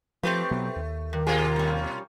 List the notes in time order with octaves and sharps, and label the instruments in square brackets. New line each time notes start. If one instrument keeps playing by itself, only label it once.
[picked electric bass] F3 [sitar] A3 [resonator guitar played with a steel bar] C4 G4 B4
[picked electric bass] B2 F#3 B3
D#2
[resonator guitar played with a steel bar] G2 [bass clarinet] D#3
[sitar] B2 A#3 F4 [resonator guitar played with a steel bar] G#4
[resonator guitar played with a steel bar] G3 C#4